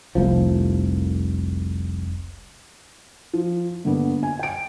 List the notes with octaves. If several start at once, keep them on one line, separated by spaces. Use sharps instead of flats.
F1 C2 F3
F3
G2 D3 A#3 B3
G#5
G5 D7